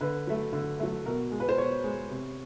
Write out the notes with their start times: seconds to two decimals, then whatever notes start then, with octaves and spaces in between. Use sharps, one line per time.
0.01 D3 B4
0.27 F#3 A3
0.53 D3
0.80 F#3 A3
1.06 B2 A#4
1.32 G#3
1.40 B4
1.49 C5
1.58 B2 C#5
1.84 G#3
2.10 C3